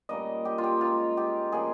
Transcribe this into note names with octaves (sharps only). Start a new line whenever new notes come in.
A#2 G3 A#3 C#4 D#5
G4
F4
G4
C#3 G#3 D#4 F4
G4
A#2 F3 A#3 C#4 G#4